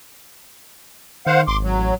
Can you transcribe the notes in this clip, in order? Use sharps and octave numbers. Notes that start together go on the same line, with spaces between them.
D#3 C5 F5 F#5
G#1 C6 D6
F#3
A1